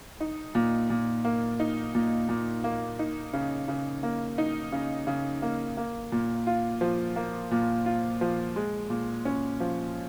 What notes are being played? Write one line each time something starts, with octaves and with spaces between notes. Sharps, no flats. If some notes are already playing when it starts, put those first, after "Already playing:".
D#4
A#2
A#2
A#3
D#4
A#2
A#2
A#3
D#4
C#3
C#3
A#3
D#4
C#3
C#3
A#3
A#3
A#2
F4
F3
A#3
A#2
F4
F3
G#3
A#2
C#4
F3